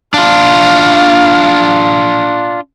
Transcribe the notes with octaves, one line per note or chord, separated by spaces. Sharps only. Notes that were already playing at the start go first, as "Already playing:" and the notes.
D4 F4 F5